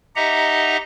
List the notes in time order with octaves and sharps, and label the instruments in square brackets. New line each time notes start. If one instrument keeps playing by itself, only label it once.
[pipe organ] D#4 G4 D#5 E5 F#5 A#5